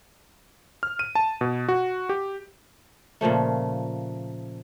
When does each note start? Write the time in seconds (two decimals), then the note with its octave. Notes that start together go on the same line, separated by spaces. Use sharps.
0.83 F6
0.99 D#7
1.15 A5
1.41 B2
1.68 F#4
2.09 G4
3.21 A#2 C#3 F3 A3